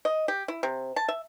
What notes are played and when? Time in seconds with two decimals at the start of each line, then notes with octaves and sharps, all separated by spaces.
0.05 D#5
0.28 G4
0.48 E4
0.63 C3
0.96 A5
1.08 E5